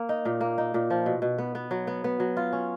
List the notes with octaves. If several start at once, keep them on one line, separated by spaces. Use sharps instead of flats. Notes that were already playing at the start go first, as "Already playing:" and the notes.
Already playing: A#3
D#4
A#2
A#3
D#4
A#2
F3
B2
B2
B3
B3
F#3
B3
B3
F#3
F4
C#4